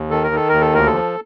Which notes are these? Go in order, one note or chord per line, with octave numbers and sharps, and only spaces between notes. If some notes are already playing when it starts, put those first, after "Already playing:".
Already playing: D#2
D#3 A4
A#4
D#3 A4
D#2 A#4
A4
D2 A#4
A4
F3